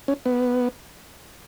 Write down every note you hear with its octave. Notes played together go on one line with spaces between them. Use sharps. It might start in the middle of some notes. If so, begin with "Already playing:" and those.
C#4
B3